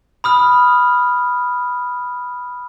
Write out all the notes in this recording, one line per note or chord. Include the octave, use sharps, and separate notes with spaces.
B5 D#6 F6